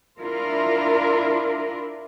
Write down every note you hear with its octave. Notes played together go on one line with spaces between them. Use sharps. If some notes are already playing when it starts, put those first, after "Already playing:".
D4 E4 F4 A#4